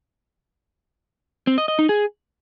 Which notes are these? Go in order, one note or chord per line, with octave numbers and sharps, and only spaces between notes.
C4
D#5
D#5
D#4
G#4